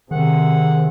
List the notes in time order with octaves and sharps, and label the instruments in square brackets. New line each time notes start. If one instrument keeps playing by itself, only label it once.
[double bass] C3 [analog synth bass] D#3 [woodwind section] G#4 F#5